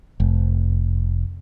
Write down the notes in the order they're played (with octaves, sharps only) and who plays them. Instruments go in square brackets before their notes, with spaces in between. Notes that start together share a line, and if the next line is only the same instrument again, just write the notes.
[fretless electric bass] F1